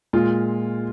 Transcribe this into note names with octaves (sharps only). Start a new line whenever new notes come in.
A#2 G#3 F4